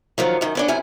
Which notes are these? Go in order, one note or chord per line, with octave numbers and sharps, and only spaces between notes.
D#3 F3 F#3
F#2 D#3
B3 C#4 D4
F#2 C3 E4 G#5